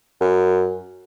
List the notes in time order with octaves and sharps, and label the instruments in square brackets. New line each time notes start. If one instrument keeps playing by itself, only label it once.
[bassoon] F#2